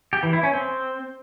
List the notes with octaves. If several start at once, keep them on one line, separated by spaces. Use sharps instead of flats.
G4
E3
E4
C#4
C4